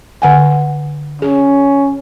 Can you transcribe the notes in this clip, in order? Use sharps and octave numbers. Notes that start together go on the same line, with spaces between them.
D3 F#5 G#5
C#4 G#4